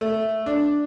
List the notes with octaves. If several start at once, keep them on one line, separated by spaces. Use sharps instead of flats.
A3
D4